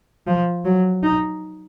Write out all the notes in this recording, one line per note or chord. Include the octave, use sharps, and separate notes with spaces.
F3
F#3
D#4